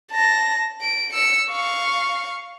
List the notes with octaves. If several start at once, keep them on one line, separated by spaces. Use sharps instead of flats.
A5 A#6
D7
E6 C#7
F5 C#6